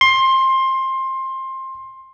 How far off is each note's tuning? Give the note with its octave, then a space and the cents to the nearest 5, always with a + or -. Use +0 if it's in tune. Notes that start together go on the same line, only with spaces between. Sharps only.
C6 +20